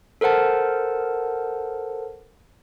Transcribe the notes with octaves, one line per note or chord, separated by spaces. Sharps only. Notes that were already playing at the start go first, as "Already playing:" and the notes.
A4 A#4 C5 F#5 A5